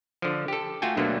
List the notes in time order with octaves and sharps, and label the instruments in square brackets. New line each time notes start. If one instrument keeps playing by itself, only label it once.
[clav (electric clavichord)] D3 F3
G4 A4
A3 F4 F#4 G5 G#5
D2 B2 D3 F#3 A3 A#3